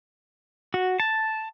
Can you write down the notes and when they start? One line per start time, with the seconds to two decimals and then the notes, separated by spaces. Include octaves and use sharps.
0.74 F#4
1.00 A5